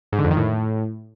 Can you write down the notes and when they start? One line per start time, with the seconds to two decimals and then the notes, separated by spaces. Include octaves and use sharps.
0.12 G#2
0.19 D3
0.25 F2
0.31 D#3
0.37 A2